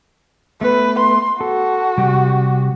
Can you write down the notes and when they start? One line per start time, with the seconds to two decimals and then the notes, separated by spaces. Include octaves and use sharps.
0.61 A3 B3 B4
0.99 C6
1.41 F#4 A4
1.98 C3 G3 G4